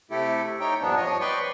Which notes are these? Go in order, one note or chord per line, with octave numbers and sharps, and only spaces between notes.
C3 A3 E4 G4 A4
D#4 C#5 G5
G2 A#2 F3 B3 D4
F3 C#5 D#5
B4 D5 G5 C6 C#6